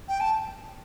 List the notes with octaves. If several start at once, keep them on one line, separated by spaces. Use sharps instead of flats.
G5
A5